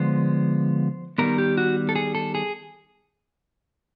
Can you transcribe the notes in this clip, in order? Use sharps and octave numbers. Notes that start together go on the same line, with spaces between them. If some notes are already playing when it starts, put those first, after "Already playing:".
Already playing: D3 F3 G#3 B3 C5
D#3 G3 B3 A#4
G4
F#4
A4
G#4
A4
G#4